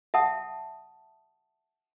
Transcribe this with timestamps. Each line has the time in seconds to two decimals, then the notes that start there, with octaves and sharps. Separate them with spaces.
0.14 E5 F#5 A5 D#6